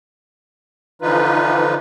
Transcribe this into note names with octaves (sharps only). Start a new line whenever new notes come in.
D3 E3 F3 D#4 F4 B4